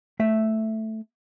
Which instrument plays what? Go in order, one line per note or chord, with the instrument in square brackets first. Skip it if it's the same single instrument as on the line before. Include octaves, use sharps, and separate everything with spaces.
[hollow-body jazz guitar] A3 E5